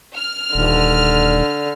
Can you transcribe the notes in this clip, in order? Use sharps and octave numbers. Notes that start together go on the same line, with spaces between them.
F6
D#1 D3